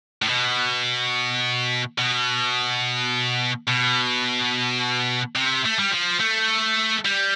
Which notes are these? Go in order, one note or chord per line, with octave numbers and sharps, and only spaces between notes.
A2
B2
B2
B2
C3
A3
G3
F3
A3
G3